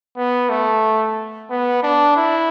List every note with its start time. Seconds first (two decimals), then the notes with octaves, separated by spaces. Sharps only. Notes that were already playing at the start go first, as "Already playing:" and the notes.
0.17 B3
0.50 A3
1.50 B3
1.83 D4
2.17 E4